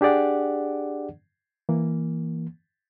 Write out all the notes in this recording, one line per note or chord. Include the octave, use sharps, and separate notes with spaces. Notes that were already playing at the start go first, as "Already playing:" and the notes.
D4 G4 G#4 D5 F#5
E3 A#3